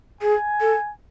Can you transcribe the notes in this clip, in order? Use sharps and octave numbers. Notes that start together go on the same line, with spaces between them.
G#4 G#5
A4